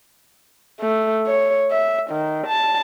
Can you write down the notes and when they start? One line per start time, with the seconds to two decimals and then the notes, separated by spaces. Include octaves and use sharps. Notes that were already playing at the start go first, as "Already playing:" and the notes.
0.81 A3
1.27 C#5
1.71 E5
2.11 D#3
2.47 A5